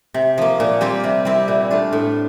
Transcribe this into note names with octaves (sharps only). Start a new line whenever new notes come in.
C3
F3 A#3
A#2
G3 C4 F4
C3
G3 C4 E4
A#2
A3 D4 F4
A2